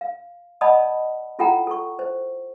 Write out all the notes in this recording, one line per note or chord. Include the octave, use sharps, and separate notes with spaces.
F5
D5 D#5 F#5 A5 B5 D#6
E4 F4 A4 F#5 G5 A#5
A4 C#6
C5